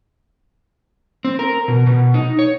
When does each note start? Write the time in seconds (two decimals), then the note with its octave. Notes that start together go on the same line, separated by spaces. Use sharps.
1.25 C4
1.39 A#4
1.68 B2
1.87 B2
2.14 D#4
2.39 C#5